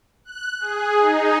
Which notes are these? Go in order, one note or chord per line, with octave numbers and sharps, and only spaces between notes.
F#6
G#4
D#4